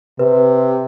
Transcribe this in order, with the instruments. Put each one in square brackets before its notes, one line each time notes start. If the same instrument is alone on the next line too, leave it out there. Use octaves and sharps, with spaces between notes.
[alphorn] C3 [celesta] B4